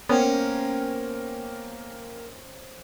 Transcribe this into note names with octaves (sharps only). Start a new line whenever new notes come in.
A#3 B3 C#4 A#4 C5 G5